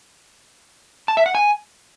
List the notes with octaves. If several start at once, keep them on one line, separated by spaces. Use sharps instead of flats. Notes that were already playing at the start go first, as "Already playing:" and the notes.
A5
E5
F#5
G#5